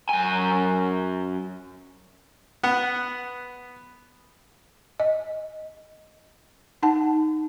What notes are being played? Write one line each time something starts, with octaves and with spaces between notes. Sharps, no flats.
F#2 G#5
B3 F#5
D#5
D#4 F#5 A5